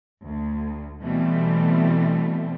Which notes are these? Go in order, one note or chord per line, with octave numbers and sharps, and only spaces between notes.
D2
B2 E3 G3 A3 C4